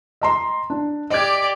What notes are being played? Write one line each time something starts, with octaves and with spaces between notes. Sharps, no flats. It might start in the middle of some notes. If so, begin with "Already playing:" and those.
D#5 A#5 C6
D4
G4 D5 D#5 G#6